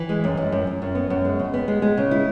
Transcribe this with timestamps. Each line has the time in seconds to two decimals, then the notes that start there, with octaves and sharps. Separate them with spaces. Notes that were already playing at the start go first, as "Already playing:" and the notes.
Already playing: E3
0.09 G#3
0.24 F#2
0.37 F#2
0.52 F#2
0.67 F#2
0.82 F#2
0.95 B3
1.10 F#2
1.25 G#3
1.39 C#3
1.54 B3
1.68 G#3
1.82 G#3
1.97 C#3
2.11 E4